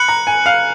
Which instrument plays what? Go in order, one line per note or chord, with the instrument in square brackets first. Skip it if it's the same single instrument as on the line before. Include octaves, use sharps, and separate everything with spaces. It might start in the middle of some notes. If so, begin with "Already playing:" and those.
Already playing: [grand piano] B5 [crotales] F#6 C#7 F#7
[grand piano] A#5
G#5
F5